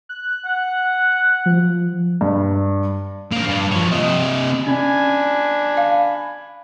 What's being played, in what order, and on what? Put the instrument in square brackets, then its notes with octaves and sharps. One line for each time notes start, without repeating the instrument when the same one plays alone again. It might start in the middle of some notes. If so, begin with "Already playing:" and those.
[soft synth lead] F#6
[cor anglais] F#5
[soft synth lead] F3
[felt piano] G2
[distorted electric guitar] F3 A#3
G2
F3 C#5
C3 D#5
[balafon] C#4 [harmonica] D4 G#5 B5
[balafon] F5